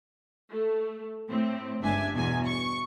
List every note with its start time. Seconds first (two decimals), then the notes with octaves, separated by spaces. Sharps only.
0.52 A3
1.28 A2 C4
1.82 G1 C#2 D4 E5 G#5
2.14 E2 B2 G#5
2.46 C#6